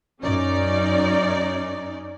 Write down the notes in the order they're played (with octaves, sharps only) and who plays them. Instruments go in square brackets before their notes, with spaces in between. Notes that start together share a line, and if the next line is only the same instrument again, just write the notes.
[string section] F#2 C#4 D#4 D5